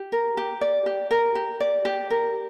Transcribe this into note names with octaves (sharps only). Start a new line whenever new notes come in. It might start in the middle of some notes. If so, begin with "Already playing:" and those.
Already playing: G4
A#4
G4
D5
G4
A#4
G4
D5
G4
A#4